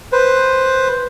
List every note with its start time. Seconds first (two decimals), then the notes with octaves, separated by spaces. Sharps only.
0.12 B4 C5